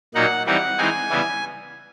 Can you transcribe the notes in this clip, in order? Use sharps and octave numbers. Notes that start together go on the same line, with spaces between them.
A#2 F#3 A#3 D#4 F#5
E3 G3 C4 D#4 F#5
E3 G#3 C4 D#4 G#5
C#3 E3 G3 B3 E4